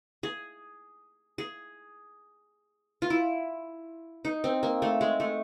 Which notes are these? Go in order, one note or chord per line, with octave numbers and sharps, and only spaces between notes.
G#4
G#4
F4
E4
D#4
C4
A#3
A3
G#3
A3